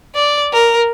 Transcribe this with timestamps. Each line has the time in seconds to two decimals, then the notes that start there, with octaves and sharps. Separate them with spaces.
0.15 D5
0.53 A#4